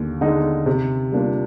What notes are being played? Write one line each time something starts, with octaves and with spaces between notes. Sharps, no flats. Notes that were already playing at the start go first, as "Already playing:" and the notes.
Already playing: D#2 D3
D3 G#3 D#4
C3
G3 A#3 D4 F4